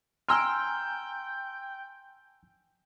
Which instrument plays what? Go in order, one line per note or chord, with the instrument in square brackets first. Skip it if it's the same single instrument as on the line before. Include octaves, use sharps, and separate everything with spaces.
[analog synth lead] G5 [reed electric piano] G#5 A#5 F6 [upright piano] C6 E6